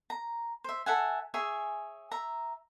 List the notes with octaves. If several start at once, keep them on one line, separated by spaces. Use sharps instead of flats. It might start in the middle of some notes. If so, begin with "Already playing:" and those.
A#5
C5 E5
A4 E5 F#5 G#5
G#4 C#5 E5 G#5
E5 A#5